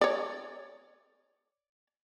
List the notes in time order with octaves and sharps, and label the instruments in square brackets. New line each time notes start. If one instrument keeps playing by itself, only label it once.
[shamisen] C#5 D5